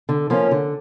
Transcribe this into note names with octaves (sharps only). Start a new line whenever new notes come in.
D3
F3 A#3 C#4 F4
D3